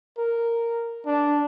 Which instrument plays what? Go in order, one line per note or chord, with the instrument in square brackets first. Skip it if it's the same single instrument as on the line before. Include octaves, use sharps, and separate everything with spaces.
[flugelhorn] A#4
D4